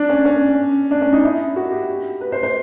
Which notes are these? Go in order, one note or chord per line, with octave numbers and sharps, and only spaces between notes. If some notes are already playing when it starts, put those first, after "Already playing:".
Already playing: D4
C#4
C#4
D4
C#4
D#4
E4
F#4
G4
B4
C5
C5